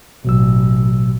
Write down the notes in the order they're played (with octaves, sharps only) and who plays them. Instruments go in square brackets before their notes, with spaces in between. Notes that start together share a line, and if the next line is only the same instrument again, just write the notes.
[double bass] A1 [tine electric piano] B2 F#3 E6